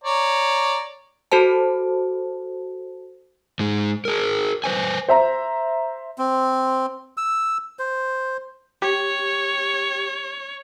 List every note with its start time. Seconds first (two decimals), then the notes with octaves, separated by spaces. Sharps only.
0.04 C#5 D5 A#5
1.32 F#4 A4 C5 A5
3.60 G#2 G#3
4.05 G#4 A#4
4.64 B4 C5 G#5
5.09 C5 E5 A#5
6.18 C4
7.17 E6
7.79 C5
8.82 G4 C#5